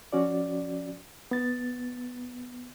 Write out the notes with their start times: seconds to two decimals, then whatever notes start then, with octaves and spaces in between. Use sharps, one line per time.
0.13 F3 C#4 F#4 D5
1.31 B3 A6